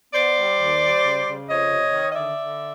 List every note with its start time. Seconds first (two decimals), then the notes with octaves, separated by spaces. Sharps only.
0.14 B3 C5 D5
0.36 G3
0.59 D#2
0.82 G3
1.03 C#3
1.27 C#3
1.48 F2 C#5 D#5
1.70 C3
1.93 D#3
2.11 D#5
2.15 D3 D5 E5
2.39 D3